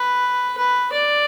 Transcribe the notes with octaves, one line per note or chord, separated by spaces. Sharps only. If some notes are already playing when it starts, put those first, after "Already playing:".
Already playing: B4
B4
D5